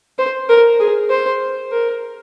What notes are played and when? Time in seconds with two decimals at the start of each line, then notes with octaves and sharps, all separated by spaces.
0.18 C5
0.49 A#4
0.79 G#4
1.10 C5
1.71 A#4